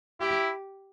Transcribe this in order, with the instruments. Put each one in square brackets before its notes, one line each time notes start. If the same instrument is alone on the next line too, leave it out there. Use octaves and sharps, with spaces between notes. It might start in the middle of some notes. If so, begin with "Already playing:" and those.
[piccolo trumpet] E4 [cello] G4